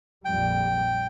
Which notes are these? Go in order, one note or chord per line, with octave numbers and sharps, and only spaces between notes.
A#1 F2 G3 G5